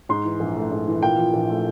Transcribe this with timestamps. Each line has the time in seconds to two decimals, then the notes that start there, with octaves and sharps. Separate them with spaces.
0.09 G#2 C6
0.25 E3
0.40 A#1
0.56 A3
0.71 G#2
0.88 E3
1.02 A#2 G5
1.18 F3
1.34 A#1
1.50 A3